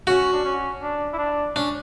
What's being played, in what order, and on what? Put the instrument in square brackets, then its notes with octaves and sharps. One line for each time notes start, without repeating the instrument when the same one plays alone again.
[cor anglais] C#4 [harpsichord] F#4
[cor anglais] D4
C#4
D4
E4
D4
[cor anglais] C#4 [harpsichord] D4